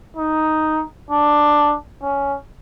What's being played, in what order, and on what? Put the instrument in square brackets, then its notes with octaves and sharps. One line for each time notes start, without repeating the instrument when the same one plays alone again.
[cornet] D#4
D4
C#4